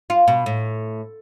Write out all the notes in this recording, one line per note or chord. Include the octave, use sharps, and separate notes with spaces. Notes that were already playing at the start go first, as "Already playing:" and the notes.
F4
B2
A2